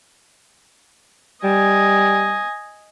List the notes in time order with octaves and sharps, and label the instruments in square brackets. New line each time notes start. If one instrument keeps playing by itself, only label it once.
[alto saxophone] G3 [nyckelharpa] D#5 G#5